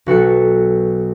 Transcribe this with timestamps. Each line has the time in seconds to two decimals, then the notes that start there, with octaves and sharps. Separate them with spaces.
0.06 B1 F#4 A4 C#7